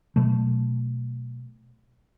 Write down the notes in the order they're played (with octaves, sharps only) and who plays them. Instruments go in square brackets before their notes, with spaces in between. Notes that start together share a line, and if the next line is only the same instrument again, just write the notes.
[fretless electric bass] B2 F#3 A3